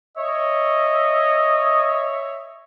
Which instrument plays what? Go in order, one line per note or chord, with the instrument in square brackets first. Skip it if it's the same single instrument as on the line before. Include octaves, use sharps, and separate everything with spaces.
[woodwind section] C#5 E5 [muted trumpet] D#5